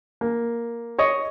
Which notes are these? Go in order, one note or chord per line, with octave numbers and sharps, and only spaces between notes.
A#3
C#5 D#5 C#6